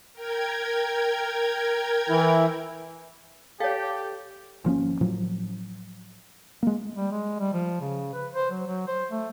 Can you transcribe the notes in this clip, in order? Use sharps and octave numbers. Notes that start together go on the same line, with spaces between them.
A#4 G5 G#6
E3 E4
G4 A4 C#5 F5
G#1 F3 A#3 C#4
A2 F3 F#3
G#3 A#3
G3
G#3
G3
F3
C#3
B4
C5
F#3
F#3
C5
A3